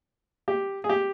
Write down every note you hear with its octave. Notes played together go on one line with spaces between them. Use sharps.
G4
G#4
G4